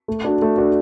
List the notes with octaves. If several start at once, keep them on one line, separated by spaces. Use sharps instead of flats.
A3
D4 F#4
A3
D4 F#4